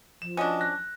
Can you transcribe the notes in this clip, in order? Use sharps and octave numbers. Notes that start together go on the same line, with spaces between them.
F3 E7
C#4 D4 F#4 D#5
F#6 A#6